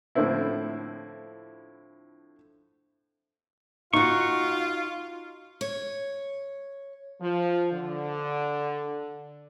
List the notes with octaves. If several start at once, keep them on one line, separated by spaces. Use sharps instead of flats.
A2 D3 F3 C4 E4
D#4 F4 F#4 C#6
C#5
F3
D3